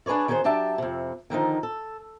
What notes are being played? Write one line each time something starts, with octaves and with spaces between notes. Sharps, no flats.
D4 G#4 B4 C#5 D5
D#3 C#4 F#4 G#4 C5
F#3 D4 G4 D5 E5 A5
F2 C3
D3 D#3 F3 D#4
A4